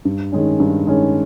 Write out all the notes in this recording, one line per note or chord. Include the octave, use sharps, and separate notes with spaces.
G2
D#3 G#3 C#4
G2
D#3 G#3 C#4